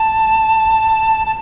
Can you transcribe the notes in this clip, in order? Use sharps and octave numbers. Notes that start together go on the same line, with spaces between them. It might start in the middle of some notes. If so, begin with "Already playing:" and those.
Already playing: A5
A5